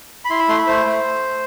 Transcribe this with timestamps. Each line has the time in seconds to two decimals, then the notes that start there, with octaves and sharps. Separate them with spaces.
0.25 B5
0.30 E4 C6
0.39 B5
0.49 A3 C6
0.58 B5
0.67 A3 C5
0.86 A3